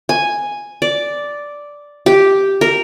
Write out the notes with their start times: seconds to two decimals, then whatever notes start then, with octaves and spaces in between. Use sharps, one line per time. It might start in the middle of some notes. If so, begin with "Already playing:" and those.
0.09 G#5
0.82 D5
2.06 G4
2.61 A#4